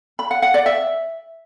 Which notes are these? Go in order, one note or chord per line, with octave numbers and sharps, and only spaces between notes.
B5
F#5
F#5
D5
E5